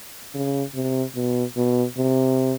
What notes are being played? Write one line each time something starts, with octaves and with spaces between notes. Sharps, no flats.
C#3
C3
B2
B2
C3